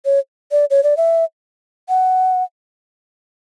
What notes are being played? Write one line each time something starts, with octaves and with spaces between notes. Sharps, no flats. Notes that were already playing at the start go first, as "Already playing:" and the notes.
C#5
D5
C#5
D5
E5
F#5